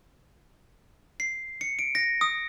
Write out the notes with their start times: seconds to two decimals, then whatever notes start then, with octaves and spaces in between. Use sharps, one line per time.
1.20 C7
1.61 C#7
1.79 D7
1.95 A#6
2.21 D#6